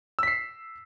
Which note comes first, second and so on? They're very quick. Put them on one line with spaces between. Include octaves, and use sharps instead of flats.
E6 B6 C7